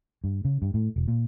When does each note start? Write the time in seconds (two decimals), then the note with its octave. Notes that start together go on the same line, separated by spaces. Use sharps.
0.24 G2
0.45 C#3
0.62 G2
0.74 A2
0.96 E1
1.08 A#2